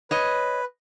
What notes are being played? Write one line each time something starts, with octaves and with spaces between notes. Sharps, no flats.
B4 C#5 D#5